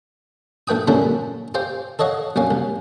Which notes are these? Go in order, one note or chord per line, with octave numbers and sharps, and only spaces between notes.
A#1 A3 B4 G5 D#6
F#2 A#2 D3 G3 C#4 E4
G4 C5 F5 G5
A4 C#5 D#5 F5 F#5
A#1 F#2 C#4 F5
C2